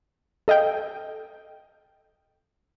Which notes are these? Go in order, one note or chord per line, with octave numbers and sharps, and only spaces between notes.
A4 D#5 F5 G5